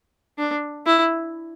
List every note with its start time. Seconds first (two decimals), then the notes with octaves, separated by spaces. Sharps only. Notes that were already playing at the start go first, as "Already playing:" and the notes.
0.39 D4
0.87 E4